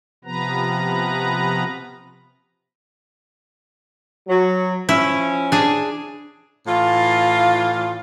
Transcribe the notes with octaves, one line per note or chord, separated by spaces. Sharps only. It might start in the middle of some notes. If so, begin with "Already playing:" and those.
C3 F3 B3 B4 A#5
F#3
F3 C#4 E4
D4 G#4
A2 E3 F4